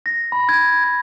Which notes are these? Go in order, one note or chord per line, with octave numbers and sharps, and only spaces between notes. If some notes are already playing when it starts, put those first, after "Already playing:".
A#6
B5
G#6
G#6